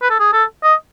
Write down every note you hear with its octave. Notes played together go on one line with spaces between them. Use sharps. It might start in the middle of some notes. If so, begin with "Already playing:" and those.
B4
A4
G#4
A4
D#5